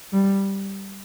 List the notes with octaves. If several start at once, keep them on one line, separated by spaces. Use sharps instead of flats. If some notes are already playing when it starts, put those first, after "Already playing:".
G3